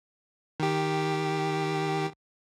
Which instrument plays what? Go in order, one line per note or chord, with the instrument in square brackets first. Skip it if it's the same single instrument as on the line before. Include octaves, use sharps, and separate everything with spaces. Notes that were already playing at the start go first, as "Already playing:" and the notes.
[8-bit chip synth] D#3 G4